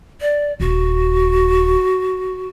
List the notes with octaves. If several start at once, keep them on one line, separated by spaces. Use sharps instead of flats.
D5
D#1 F#4